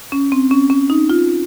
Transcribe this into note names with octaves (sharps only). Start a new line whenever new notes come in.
C#4
C4
C#4
C#4
D#4
F4